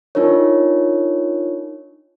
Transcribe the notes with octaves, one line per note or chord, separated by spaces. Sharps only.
D4 D#4 F4 A#4 C#5